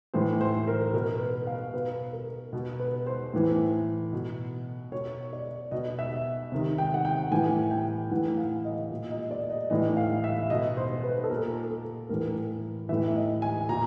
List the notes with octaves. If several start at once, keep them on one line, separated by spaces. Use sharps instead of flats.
A2 E3 C5
C5
A#4
B2 A#4
B4
F5
B2 B4
A#4
B2
B4
C5
A2 E3
B2
B2 C#5
D5
B2 D#5
E5
C3 D#3
G5
F#5
G5
A2 E3 G#5
G5
A2 E3 F#5
F5
D#5
A#2
D#5
D5
D#5
A2 E3 D#5
F5
E5
B2 D#5
C5
B4
A4
A#2 A#4
A4
A2 E3 A#4
A2 E3 E5
D#5
G#5
A#2 A#5